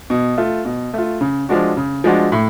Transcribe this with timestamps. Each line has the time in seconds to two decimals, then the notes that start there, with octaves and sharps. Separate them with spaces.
0.10 B2
0.38 A3 F4
0.65 B2
0.94 A3 F4
1.21 C#3
1.49 F3 G#3 D4 F#4
1.77 C#3
2.04 F3 G#3 D4 F#4
2.32 A2